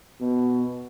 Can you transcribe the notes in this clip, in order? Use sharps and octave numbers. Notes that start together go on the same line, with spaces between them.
B2